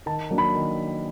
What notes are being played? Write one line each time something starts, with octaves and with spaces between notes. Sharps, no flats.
D#3 A5
F#3 A#3 D4
B5
D#3